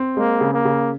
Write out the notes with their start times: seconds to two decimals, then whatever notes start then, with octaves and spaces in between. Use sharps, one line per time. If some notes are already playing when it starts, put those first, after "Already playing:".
Already playing: C4
0.17 G#3 A#3
0.41 C#3
0.53 A#3
0.65 C#3